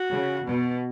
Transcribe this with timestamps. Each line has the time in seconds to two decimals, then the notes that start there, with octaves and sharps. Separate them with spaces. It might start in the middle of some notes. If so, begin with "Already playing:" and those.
Already playing: F#4
0.11 C#3
0.44 B2